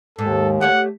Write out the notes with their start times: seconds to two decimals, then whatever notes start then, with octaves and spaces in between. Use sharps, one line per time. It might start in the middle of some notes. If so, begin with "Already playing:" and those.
0.19 D#2 G#2 A4
0.61 A3 G4 C#5 F#5